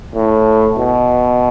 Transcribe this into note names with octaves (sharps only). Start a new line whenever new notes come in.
A2
B2